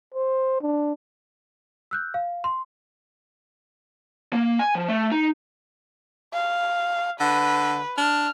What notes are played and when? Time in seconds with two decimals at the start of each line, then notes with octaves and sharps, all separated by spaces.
0.14 C5
0.61 D4
1.91 E6 F#6 G6
2.14 F5
2.44 C6
4.33 A#3
4.59 G#5
4.75 F3
4.89 A3
5.12 D#4
6.34 F5
7.20 D3 B4
7.98 D4 F6